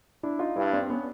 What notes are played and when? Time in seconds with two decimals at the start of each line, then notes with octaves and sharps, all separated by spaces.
0.23 D4 E4
0.39 D#4 F4
0.56 G2 D4 E4
0.73 C4 D4
0.90 B3 C#4